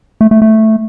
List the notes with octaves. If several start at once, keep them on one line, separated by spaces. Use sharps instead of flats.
A3
A3
A3